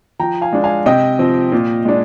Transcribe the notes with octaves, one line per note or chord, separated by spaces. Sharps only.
F3 G5 A#5
F5 G#5
G#3 D4
F5 G#5
C3 D#5 G5
F3 C4
A#2
G#3 D4